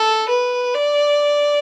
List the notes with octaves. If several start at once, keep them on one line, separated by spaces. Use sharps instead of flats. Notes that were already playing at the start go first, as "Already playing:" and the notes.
Already playing: A4
B4
D5